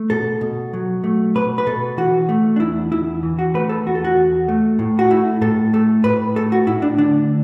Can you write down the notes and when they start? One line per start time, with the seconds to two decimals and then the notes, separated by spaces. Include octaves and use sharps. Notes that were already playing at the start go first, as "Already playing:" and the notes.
Already playing: A3
0.10 B2 A4
0.41 B2
0.73 F#3
1.04 A3
1.35 B2 B4
1.58 B4
1.66 B2 A4
1.97 E3 F#4
2.29 A3
2.56 D4
2.60 E2 E4
2.92 E2 E4
3.23 E3
3.39 F#4
3.54 A3 B4
3.69 A4
3.86 E2 F#4
3.95 A4
4.04 F#4
4.16 E2
4.48 A3
4.79 A2
4.99 F#4
5.10 A3 E4
5.41 A2 A4
5.73 A3 A4
6.04 A2 B4
6.36 A3 A4
6.52 F#4
6.67 A2 E4
6.82 D4
6.98 D3 D4